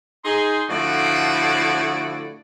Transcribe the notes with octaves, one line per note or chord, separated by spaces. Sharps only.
D#4 G#4 C6
A2 D3 F3 A3 F#4 D5